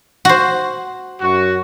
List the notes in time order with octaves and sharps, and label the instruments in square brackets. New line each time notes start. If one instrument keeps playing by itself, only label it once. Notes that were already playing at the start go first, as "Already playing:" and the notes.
[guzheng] F#4 C5
[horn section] F#2 F#4